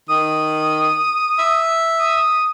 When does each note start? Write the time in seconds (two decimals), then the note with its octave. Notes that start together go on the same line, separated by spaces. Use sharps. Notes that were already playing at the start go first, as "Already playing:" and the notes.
0.10 D#3 D#6
1.39 E5
2.00 D#6